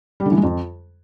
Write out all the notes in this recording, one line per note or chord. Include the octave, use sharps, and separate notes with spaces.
G3
D3
E3
G#3
F2